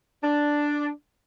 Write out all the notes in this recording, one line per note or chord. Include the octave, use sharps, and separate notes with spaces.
D4